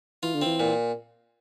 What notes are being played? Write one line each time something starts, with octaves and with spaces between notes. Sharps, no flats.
E3 F4
D3
E3 C4
A#2